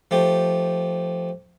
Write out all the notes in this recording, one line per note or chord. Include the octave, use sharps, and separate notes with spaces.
F3 A3 G4